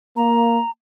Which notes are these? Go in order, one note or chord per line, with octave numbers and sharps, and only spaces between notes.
A#3 A#5